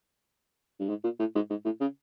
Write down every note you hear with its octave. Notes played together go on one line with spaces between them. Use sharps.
G2
G#2
A#2
A2
G#2
G#2
A2
C#3